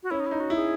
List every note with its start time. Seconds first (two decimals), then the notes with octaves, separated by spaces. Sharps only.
0.03 F#4
0.10 C#4 E4
0.20 D#4
0.26 E4
0.31 D#4
0.40 F#4
0.50 E4
0.55 G#4